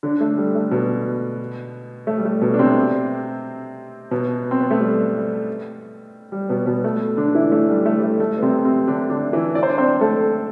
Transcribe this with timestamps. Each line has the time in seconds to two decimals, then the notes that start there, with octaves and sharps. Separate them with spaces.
0.03 D3 D4
0.21 A3
0.38 G3
0.55 A3
0.71 B2 B3
2.07 A3
2.18 G3
2.25 A3
2.42 B2 B3
2.54 D4
2.59 C3 C4
4.11 B2 B3
4.51 C4
4.61 B3
4.71 A3
4.80 G3
6.32 G3
6.49 B2 B3
6.66 B2 B3
6.84 A3
7.17 D3 D4
7.35 E3 E4
7.52 A3
7.69 G3
7.85 A3
7.98 G3
8.03 A3
8.20 A3
8.38 B3
8.42 C3 C4
8.64 C3 C4
8.87 D3 D4
9.10 D3 D4
9.33 E3 E4
9.55 D5
9.63 C5
9.69 D4 D5
9.78 C4 C5
10.01 A3 A4